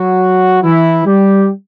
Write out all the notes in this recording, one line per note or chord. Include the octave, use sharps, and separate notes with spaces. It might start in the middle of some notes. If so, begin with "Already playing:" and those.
Already playing: F#3 F#4
E3 E4
G3 G4